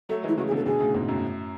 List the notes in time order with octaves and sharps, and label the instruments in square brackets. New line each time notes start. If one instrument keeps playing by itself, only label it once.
[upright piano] F#3 A3 [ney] A4
[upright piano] E3 G#3 [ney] E4
[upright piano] C#3 E3 [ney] F#4
[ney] G#4
[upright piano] B2 D3 [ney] A4
[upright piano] B2 D3 [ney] G#4
[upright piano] A2 C#3
G#2 B2
F#2 A2